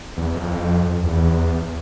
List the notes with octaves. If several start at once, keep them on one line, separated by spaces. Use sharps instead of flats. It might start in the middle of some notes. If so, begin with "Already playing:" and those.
E2
F2
E2